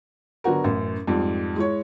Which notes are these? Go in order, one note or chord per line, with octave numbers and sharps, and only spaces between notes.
D3 F#3 B3 F#4 A#4
A1 F#2
F2 G#2 G3
G#3 E4 C#5